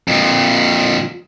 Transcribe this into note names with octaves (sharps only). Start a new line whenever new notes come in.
F2 A#2